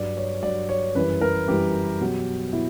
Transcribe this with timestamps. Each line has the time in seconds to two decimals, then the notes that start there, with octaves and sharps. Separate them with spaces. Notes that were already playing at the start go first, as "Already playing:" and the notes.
Already playing: G2 F#3 D5
0.17 C#5
0.42 G2 F#3 D5
0.69 C#5
0.95 F#2 E3 G3 B4
1.21 A#4
1.48 F#2 E3 G3 G4
2.01 B2 F#3
2.53 B2 E4